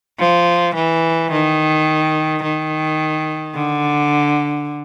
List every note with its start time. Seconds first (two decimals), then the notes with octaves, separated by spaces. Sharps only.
0.19 F3
0.75 E3
1.32 D#3
2.43 D#3
3.55 D3